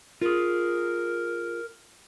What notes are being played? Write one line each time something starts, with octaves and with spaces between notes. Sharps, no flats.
F4 G#4 A#4